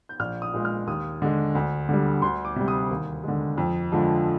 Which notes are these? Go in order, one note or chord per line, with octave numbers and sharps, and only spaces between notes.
G6
A#1 F6
D#6
A#2 G#3
F6
D#2 D#6
D3 G#3
D2
D3 G3
D2 C6
D6
C3 G3
D#6
D#2
D3 G#3
F2
D3 F3 G#3